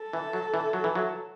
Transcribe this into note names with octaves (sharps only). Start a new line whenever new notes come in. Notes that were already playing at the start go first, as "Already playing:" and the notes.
Already playing: A4
E3
F#3
E3
F#3
E3
F#3